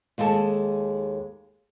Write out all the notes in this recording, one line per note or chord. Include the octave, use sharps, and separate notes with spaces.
D#2 G#3 A4 G5 A5